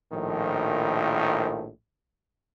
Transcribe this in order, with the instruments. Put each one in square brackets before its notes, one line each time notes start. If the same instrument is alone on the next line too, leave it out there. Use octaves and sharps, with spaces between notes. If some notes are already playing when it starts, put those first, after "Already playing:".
[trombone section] A#1 A2 D#3 F3